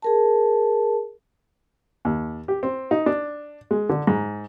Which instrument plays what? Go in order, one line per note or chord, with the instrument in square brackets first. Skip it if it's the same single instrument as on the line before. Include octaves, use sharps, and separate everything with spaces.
[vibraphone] G#4 A#4 A5
[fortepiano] D#2
G4
C4
D#4
D4
G#3
D3
G#2